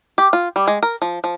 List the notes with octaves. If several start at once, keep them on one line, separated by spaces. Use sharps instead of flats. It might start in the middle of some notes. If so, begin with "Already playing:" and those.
G4
F4
G3
G#3
A#4
F3
F3